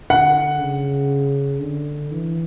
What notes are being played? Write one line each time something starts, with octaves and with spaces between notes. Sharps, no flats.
D3 F#5
C#3
D3
E3